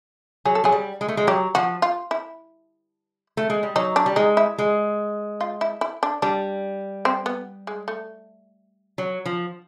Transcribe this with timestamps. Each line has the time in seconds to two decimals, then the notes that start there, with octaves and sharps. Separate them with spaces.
0.45 F#3 G#4
0.55 A4
0.64 F#3 G#4
0.72 G3
1.01 G#3
1.08 A3
1.17 G#3
1.27 F#3 G4
1.55 F3 F#4
1.82 F4
2.11 E4
3.37 A3
3.50 G#3
3.63 G3
3.76 F#3 D#4
3.96 D4
4.06 G3
4.16 G#3 D#4
4.37 E4
4.58 G#3
5.41 F4
5.61 E4
5.81 E4
6.03 D4
6.22 G3 D4
7.05 C4
7.26 B3
7.67 G#3
7.88 A3
8.98 F#3
9.26 F3